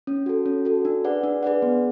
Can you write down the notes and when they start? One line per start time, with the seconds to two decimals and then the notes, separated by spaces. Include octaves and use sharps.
0.07 C#4
0.26 F#4 A4
0.46 C#4
0.65 F#4 A4
0.85 D4
1.05 G#4 B4 D5 F#5
1.23 D4
1.43 G#4 B4 D5 F#5
1.62 B3